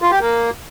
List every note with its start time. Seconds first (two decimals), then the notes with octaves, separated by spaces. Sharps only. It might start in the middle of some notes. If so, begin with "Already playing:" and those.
0.02 F4
0.11 G4
0.21 A#3